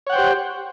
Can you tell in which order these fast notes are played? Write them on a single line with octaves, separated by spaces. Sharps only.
C#5 F#5 G5 C5 G4